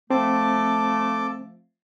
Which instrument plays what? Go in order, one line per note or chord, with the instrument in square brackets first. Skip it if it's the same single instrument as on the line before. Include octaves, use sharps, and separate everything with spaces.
[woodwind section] F3 A3 [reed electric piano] C4 [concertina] A4 A5 D6